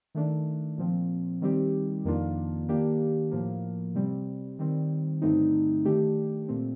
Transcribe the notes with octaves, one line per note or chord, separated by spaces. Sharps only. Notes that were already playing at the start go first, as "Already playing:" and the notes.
D#3 A3 D4
A#2 F3 C4
D#3 G3 C4 G4
F2 D#3 A#3 D4 F4
D#3 A#3 D4 G4
A2 F3 A#3
C3 G3 C4
D#3 G3 C4
G2 D3 A3 C4 D#4
D#3 A3 D4 G4
A#2 A3 C4